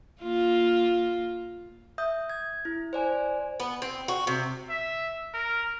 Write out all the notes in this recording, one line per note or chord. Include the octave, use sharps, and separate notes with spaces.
A#3 F4
E5 D#6 G6
G#6
E4
C5 D5 G#5
B3
C4
F#4
C3
E5
A#4